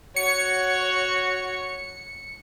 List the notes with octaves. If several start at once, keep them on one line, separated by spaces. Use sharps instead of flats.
F#4 C#5 C#7